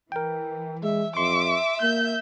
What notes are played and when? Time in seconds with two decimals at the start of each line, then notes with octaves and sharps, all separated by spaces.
0.12 E3 A#4 G5
0.83 G#3 E5
1.17 F2 E5 C6 D6
1.82 A#3 G6